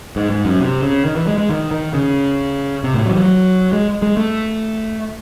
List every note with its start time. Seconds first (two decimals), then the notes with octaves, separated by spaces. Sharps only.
0.16 G#2
0.30 G#2
0.45 F#2
0.60 C3
0.83 C#3
1.05 D#3
1.16 E3
1.27 G#3
1.38 G#3
1.49 D#3
1.71 D#3
1.94 C#3
2.84 C3
2.94 A2
3.06 F#3
3.11 E3
3.17 F#3
3.73 G#3
4.02 G#3
4.17 A3